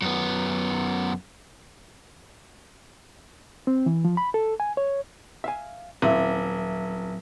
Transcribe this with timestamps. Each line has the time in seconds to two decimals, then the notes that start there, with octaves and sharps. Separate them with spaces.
0.02 F#2 B3
3.67 C4
3.86 E3
4.05 F3
4.17 B5
4.34 A4
4.60 G#5
4.77 C#5
5.44 E5 F5 G#5
6.02 D#1 F#3 C4 E4